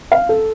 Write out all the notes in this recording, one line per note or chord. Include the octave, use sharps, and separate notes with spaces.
F5
A4